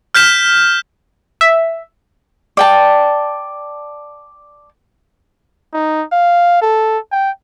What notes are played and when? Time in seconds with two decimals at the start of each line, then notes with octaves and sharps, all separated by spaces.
0.15 F6 G6 B6 E7
1.41 E5
2.57 D5 G5 A5
5.73 D#4
6.12 F5
6.62 A4
7.12 G5